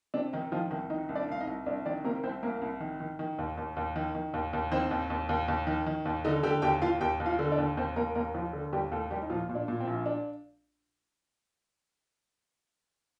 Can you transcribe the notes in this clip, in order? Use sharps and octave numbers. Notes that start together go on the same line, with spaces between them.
C3 D4
D#3 D#4
D#3 F3 F4
C2 D#3 D#4
D#3 D#4
C2
D4 D5
C2 F5
D#4 D#5
C2
C2 D4 D5
D#3 D4 D5
C3 A#3 A#4
C2 C4 C5
C2 A#3 A#4
C2
D#3
D#3
D#3
D#2
D#2
D#2
D#3
D#3
D#2
D#2
D#3 C4 C5
D#2
D#2
D#2
D#2
D#3
D#3
D#2
D3 D#4 D#5
D3 G4 G5
D#2 G4 G5
D#2 F4 F5
D#2 G4 G5
D#2
F4 F5
D3
D4 D5
D#2
D#2 C4 C5
D#2 A#3 A#4
D#2 A#3 A#4
D#2 F3 F4
D3
D#2 G3 G4
D#2 A3 A4
D#2 G3 G4
D#4
A#2 F3 F4
A#2
D4
A#2
C4
A#1
D4